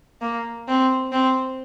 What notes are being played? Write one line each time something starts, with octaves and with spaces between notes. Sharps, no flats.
A#3
C4
C4